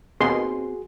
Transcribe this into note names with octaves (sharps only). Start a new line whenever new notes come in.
D#2 B2 C4 F#4 G#4 C6